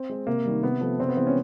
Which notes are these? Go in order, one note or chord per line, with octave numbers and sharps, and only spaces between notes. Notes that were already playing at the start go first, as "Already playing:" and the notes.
Already playing: C4
G#3
C3 A#3
D#3 G3
C3 B3
F3 A3
C3 C4
B3
E3 G#3 C4
C#4